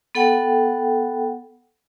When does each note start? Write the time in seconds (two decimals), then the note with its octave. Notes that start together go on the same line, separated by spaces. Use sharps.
0.15 B3 A4 F#5 G5